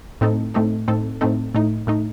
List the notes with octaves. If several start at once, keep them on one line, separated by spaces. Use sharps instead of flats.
A2 A3 C4 D#4 A4
A2 A3 C4 D#4 A4
A2 A3 C4 D#4 A4
A2 A3 C4 D#4 A4
A2 A3 D#4
A2 A3 D#4